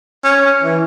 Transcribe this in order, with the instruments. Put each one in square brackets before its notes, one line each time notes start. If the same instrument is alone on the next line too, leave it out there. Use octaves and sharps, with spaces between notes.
[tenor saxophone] C#4
E3